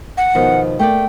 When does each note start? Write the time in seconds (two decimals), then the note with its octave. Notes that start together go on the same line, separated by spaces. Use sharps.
0.17 F#5
0.35 B2 D#3 F3
0.79 A3 A#3 D5 G5